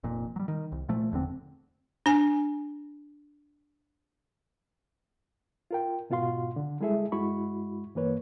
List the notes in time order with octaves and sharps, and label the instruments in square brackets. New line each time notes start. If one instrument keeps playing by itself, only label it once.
[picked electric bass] F1 F2 A#2
F#3 G3
D#3
C2
A#2 F3 A3
F1 E2 D3 C4
[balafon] D4 G#5
[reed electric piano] F4 A#4 G5
G#2 B2 F4 F#4 F5 C6
D3
G3 G#3 E4 G#4 A4 E5
G2 G#3 E4 F#4 B5 C#6
G2 E3 A#3 B4 C#5